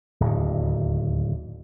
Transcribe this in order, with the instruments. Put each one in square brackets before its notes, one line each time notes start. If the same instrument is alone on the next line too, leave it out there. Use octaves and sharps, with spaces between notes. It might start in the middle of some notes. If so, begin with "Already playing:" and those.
[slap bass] D1 D#2